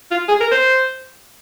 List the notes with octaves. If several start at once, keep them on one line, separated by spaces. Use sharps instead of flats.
F4
G#4
A#4
C5